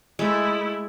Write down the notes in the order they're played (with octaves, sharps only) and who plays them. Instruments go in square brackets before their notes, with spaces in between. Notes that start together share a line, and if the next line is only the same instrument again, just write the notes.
[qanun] G#3 [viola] A3 E4